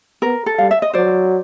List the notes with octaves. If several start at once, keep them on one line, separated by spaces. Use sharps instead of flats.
B3 A#4
A4
G3 F5
E5
D#5
F#3 C5 D5